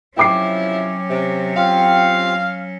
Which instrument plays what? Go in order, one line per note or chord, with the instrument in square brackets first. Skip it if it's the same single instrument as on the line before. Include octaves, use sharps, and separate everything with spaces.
[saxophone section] C3 F3 E4 [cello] F#3 C#4 [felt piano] G5 D6 C7
[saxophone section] C3
[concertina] C4 F4 G4 [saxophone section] F5